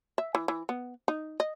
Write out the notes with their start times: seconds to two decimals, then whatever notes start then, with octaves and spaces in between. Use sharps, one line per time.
0.18 E5
0.35 E3
0.48 E3
0.69 B3
1.08 D#4
1.40 D#5